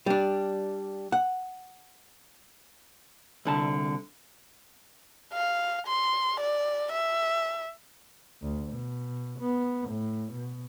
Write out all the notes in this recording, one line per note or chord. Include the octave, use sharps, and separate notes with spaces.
G3 D4
F#5
C2 D3 A5
F5
C6
D5
E5
D2
B2
B3
A2
B2